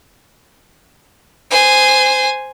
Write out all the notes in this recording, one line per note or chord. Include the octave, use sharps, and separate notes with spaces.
C5 G#5